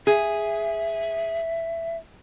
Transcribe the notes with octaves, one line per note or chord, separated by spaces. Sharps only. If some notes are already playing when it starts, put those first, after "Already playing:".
G#4 E5